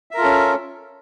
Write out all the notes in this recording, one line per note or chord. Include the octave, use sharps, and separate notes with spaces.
C#4 F4 A4 A#4 E5